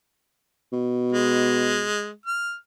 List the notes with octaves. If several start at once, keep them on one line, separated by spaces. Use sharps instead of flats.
B2
G#3
F6